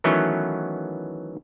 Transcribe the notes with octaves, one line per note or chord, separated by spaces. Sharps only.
D#3 E3 F#3 A3 B3 C#4